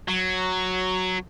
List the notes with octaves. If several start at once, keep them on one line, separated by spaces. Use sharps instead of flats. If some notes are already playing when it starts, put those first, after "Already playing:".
F#3